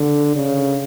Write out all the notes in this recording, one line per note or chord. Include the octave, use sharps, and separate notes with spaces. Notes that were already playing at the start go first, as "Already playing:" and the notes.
Already playing: D3
C#3